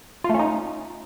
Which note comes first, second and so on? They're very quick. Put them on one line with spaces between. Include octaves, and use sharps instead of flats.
F4 A3 C#4 D#4